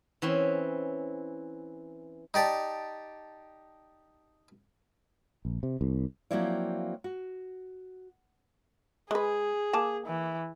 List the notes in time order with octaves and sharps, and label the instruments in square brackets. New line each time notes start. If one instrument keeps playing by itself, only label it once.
[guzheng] E3 C4 C#4
[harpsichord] D#4 G4 D5 A5
[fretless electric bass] A#1
C3
C2
[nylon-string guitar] F3 F#3 A#3 C4 E4 D5
F#4
[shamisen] G#3 B4 [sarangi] G#4
[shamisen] A#3 G#5 A5
[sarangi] E3